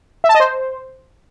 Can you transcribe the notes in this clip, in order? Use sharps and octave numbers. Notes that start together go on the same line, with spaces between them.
E5
A5
D#5
C5